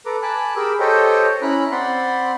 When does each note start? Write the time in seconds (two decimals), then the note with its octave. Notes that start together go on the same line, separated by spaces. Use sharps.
0.06 A4 B4 A#5 D6
0.22 G#5 A5 B5 D6 F#6
0.56 G4 G#4 A#4 B5 D6 E6
0.80 G4 A4 C5 C#5 D#5 G5
1.42 C#4 E4 A#5 B5 F#6
1.72 C4 D5 F#5 B5 C6